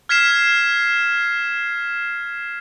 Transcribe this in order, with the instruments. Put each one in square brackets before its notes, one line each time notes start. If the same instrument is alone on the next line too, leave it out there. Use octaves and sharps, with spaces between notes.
[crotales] F6 G#6 B6 C7 E7